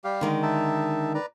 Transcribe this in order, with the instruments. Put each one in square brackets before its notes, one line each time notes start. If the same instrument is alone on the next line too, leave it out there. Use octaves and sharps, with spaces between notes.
[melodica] G3 G4 F5
[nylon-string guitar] D3 D#3 G#3
[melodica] D#4 E5 A5
B4 D5 A#5